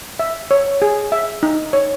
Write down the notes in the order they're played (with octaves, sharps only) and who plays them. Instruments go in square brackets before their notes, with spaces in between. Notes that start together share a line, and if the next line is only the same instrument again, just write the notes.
[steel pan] E5
C#5
G#4
E5
D#4
C#5